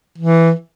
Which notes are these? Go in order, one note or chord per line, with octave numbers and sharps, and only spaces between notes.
E3